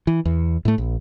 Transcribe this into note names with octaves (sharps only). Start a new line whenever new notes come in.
E3
E2
A2 A3
A#1